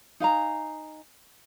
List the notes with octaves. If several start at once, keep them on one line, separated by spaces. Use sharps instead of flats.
D#4 F5 G#5 A#5